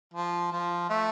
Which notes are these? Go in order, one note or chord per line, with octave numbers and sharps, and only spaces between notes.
F3
F3
A3